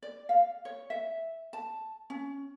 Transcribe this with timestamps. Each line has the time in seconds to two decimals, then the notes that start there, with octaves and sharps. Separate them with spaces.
0.02 D5
0.29 F5
0.65 C#5
0.90 E5
1.53 A5
2.10 C#4